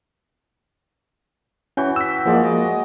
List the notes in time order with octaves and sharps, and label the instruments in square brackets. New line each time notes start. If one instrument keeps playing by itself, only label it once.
[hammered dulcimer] E3 F#4 G5 [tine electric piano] C#4
[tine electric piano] E6 B6
[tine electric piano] F3 A#3 G#4 [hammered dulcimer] F#3 G#3 D5
[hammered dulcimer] D#5 D6
G#4